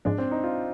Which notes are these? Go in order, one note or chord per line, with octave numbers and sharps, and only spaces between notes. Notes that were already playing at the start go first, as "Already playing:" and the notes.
G#2 F3 G#3 D4
C4
D#4
F4